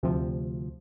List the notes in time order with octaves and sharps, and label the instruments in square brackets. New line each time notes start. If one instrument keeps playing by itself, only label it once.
[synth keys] D2 C3 F3